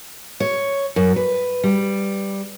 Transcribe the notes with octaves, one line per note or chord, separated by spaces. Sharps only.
C#5
F#2
B4
G3